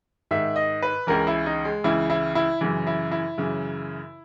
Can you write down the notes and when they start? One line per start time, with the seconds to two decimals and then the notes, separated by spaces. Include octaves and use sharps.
0.31 G#2 D#3 E5
0.56 D#5
0.82 B4
1.07 C#2 C#3 E3 A#4
1.27 E4
1.46 D#4
1.65 G#3
1.84 C#2 C#3 E3 E4
2.10 E4
2.35 E4
2.61 F#2 C#3 E3
2.87 E4
3.11 E4
3.38 F#2 C#3 E3